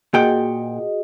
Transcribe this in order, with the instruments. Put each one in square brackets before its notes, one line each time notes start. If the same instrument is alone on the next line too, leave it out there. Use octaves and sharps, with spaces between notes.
[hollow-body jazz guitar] A#2 F#5 G5 [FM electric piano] F#4 G#4 D#5